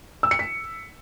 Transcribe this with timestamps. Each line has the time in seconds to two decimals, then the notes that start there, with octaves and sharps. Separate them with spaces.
0.23 E6
0.31 C#7
0.39 B6